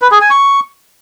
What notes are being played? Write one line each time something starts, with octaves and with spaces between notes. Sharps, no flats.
B4
G#4
G#5
C#6